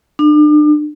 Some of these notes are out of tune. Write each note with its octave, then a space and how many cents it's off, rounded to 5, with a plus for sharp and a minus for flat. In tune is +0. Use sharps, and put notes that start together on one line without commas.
D4 +35